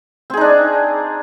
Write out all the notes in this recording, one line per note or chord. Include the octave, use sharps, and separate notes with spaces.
C4 D4 D#4 G#4